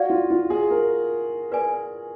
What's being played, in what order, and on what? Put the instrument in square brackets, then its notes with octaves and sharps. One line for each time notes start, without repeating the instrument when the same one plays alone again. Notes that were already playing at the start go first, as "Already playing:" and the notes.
Already playing: [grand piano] F#4 [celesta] D5 F5
[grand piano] F4
F4
G#4
A#4
[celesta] B4 D5 G#5